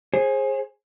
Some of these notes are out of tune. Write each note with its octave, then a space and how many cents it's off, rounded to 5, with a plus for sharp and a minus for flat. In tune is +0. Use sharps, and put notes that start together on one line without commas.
G#4 +0 C5 +35